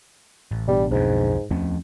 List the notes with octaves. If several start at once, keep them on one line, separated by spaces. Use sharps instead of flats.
A1
B2 G3 B3 D4
B1 F2 G#2
E2 F3 A3 C4 C#4